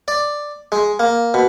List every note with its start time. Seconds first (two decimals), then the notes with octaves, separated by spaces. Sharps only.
0.08 D5
0.72 G#3
1.00 A#3
1.34 B2